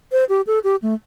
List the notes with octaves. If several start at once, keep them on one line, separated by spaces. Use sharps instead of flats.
C5
G4
A4
G4
A3